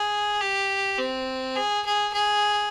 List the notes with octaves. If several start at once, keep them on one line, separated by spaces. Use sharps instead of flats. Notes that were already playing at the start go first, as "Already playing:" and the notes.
Already playing: G#4
G4
C4
G#4
G#4
G#4